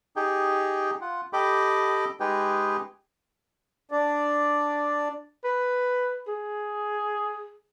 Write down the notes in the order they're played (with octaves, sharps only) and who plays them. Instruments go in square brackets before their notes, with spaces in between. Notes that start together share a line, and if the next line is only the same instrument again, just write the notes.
[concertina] D#4 G4 G#4 G5
F4 F#5
G4 A4 D#5 G5 B5 D6
G#3 D#4 G4 G#4 B4 G5
[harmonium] D4 D5
[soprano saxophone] B4
G#4